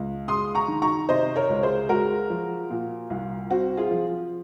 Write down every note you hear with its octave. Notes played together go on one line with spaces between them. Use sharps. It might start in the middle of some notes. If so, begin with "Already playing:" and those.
Already playing: C#2
G#3 C6 D#6
A#5 C#6
D#3
A#5 C#6
C3 C5 D#5
A#4 C#5
C#2
G#4 C5
G#3 F#4 A#4
F3
A#2
C2
C4 F#4
F4 G#4
F3